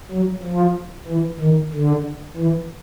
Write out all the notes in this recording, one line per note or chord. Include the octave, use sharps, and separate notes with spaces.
F#3
F3
E3
D#3
D3
E3